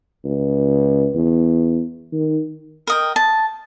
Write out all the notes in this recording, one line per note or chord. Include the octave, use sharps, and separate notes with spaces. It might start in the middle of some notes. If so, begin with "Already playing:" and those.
C#2
E2
D#3
A#4 D#5 G5
A5